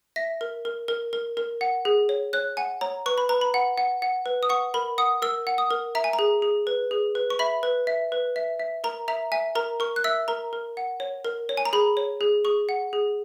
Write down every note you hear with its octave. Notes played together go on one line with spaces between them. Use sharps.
E5 A#6
A#4
A#4
A#4
A#4
A#4
F#5
G#4
C#5
C#5 F#6
F#5 G#5
C#5 A#5
B4 C#6
B5
B4 A#5
B5
F#5
F#5
F#5
B4
D#6
F#5 C#6
A#4 B5
F#5 D#6
A#4 E6
F#5
D#6
A#4
E5 A#5
G#5
A#5
G#4
G#4
B4
G#4
B4
C#6
E5 B5
B4
E5
B4
E5
E5
A#4 A#5
E5 A#5
E5 G#5
A#4 A#5
A#4 C#6
F#6
E5 E6
A#4 A#5
A#4
F#5
C#5
A#4
C#5
G#5
A#5
G#4 B5
C#5
G#4
G#4 C#6
F#5
G#4